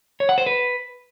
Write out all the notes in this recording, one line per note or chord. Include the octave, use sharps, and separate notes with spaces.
C#5
F#5
C5
B4